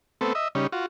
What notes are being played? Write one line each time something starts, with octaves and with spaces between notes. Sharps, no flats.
A3 B3 C4 A4
D#5 E5
C#3 G3 C#4 D#4
F4 F#4